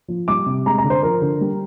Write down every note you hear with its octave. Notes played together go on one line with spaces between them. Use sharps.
F3
G3 D6
C3
G#3 A#5
A#5
D3
C5
F3 A#4
D3
G3